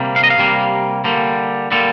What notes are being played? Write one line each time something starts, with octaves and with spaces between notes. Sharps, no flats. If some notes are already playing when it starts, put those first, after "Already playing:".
Already playing: C3 G3 A#3
F5
D#5
F5
C3 G3 A#3
D3 G3 A#3
D3 G3 A#3 A4